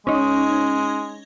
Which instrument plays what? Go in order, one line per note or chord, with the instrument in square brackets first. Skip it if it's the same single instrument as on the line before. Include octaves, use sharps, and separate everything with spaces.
[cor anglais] G#3 [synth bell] C#4 D#4